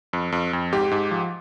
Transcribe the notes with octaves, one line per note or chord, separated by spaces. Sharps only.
F2
F2
F2
G#2 G4
G#2
F3